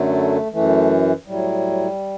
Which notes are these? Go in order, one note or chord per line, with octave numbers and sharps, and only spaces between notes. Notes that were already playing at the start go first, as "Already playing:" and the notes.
Already playing: F#2 D3 F#3 A3
F#2 E3 A3
A2 F#3 G3